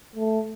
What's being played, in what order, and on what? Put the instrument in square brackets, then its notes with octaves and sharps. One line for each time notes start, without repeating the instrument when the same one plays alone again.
[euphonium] A3